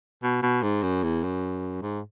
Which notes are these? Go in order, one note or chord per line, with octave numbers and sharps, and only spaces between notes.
B2
B2
G#2
F#2
E2
F#2
G#2